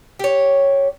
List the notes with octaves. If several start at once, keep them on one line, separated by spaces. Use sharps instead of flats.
G4 C#5